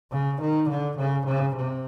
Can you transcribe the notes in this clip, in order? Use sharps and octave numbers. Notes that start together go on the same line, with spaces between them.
C#3
D#3
D3
C#3
C#3
C3